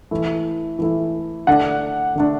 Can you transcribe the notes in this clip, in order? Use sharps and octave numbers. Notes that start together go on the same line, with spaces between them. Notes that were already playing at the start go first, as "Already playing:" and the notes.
E3 A3 E4
E3 A3 E4
D3 A3 D4 F#5
D3 A3 D4